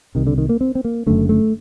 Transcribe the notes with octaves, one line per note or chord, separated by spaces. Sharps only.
C2 C3 D#3
D3
D#3
A#3
C4
C4
A#3
F#1 F#2 D3 A3
A3